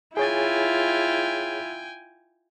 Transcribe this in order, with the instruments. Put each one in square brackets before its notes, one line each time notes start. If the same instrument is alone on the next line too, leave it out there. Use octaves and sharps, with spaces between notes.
[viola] E4 F4 [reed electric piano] G#4 C#5 A6 [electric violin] G5 G#5